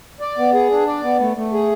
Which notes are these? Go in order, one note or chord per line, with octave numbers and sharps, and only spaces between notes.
D5
B3
G#4
D4
D5
B3
A3
A3
G#4